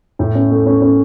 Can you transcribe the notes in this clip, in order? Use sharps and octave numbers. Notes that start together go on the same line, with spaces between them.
A2
C#4
A3
C#4
C#4